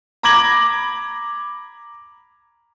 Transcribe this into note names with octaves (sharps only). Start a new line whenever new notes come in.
A#5 B5 D6 G#6 A#6 F#7